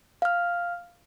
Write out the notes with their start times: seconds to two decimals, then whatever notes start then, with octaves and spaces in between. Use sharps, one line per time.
0.22 F5 F6